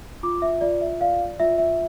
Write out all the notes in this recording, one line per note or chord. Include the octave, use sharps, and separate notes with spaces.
F4 D6
E5
F4 D5
E5
D5 F5
F4 E5
E5